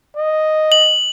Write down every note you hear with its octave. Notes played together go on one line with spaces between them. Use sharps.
D#5
F#7